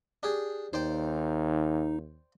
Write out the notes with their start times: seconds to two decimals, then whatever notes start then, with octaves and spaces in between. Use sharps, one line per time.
0.23 D4 G4 G#4
0.73 D#2 D#4 C5 D5 G5